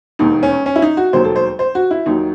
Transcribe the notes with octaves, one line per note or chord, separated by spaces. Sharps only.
E1 D#2 D#3 D#4
C#4
C#4
E4
D#4
F#4
E1 D#2 D#3 F#3 C5
A4
C5
C5
F#4
E4
D#2 D#3 F#3 D#4